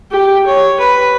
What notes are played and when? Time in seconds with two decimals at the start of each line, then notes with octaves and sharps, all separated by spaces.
0.11 G4
0.46 C#5
0.79 B4